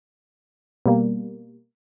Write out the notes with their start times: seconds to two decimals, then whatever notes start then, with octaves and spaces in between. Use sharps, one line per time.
0.86 B2 G3 A#3